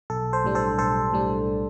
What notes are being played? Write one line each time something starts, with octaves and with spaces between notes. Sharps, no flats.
B1 A4
A4 C5
A2 G3 D4
A4 C5
B1 A4 C5
A2 G3 D4